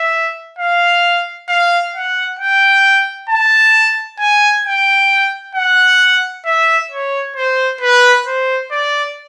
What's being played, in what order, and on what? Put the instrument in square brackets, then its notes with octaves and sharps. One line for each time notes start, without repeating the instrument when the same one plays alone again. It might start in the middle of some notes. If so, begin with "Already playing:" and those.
Already playing: [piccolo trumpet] E5
F5
F5
F#5
G5
A5
G#5
G5
F#5
E5
C#5
C5
B4
C5
D5